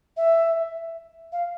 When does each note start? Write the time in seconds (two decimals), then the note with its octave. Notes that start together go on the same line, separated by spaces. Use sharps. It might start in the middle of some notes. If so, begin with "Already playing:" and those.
0.17 E5
1.32 F5